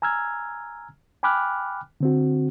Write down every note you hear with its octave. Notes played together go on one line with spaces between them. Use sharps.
G#5 A#5 E6 F6 G#6
G5 G#5 B5 D6 F6 F#6
D3 C4 F#4